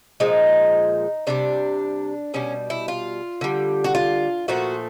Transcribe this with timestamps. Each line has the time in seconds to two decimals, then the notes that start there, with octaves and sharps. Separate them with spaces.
0.20 A#2 F3 G#3 D#4
1.27 C3 E3 G3 D4
2.34 B2 G3 C#4
2.70 E4
2.88 F4
3.41 D3 G3
3.84 F#4
3.95 F4
4.48 A#2 F3 A3 F#4